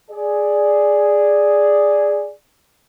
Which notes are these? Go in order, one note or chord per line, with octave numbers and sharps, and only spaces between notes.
G#4 D5